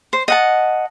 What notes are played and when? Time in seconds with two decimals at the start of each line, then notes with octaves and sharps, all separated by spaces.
0.13 C5
0.28 D#5 F#5 A5